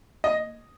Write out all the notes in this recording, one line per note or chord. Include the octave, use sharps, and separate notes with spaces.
D#5